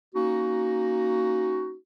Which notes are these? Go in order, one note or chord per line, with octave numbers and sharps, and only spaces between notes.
A#3 C#4 D#4 F#4